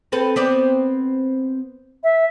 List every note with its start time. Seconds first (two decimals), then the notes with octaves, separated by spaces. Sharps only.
0.12 C4 A4 B4
0.36 B3 C4 D5
2.04 E5